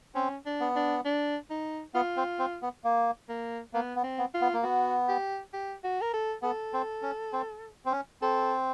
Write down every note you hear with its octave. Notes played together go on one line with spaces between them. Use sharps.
C4 C#4
D4
B3
D4
D4
D#4
B3 F4
C4
C4
B3
A#3
A#3
A#3 B3
B3
C4
B3
F4
B3
A#3
B3 F#4
G4
G4
F#4
A#4
A4
B3 A4
C4
C#4
C4
C4
C#4
C4 A4